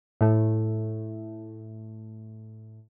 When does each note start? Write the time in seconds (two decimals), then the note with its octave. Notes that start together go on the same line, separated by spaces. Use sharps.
0.21 A2 A3